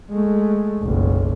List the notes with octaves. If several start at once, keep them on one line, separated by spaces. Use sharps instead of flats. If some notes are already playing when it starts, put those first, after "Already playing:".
G#3 A3
F#1 B1